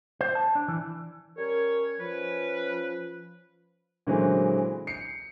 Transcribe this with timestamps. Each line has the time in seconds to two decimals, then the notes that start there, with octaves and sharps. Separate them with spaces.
0.21 C5
0.35 A5
0.55 D4
0.68 E3
1.38 G3 C#4 A#4 C#5
2.00 F3 C#4 B4
4.07 A#2 D3 E3 F#3 G#3 C4
4.87 C7 C#7